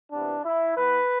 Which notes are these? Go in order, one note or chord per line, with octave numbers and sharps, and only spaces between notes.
C3 E3 B3 D4
E4
E3 B3 B4